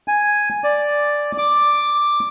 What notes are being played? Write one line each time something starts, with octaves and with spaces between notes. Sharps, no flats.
G#5
D5
D6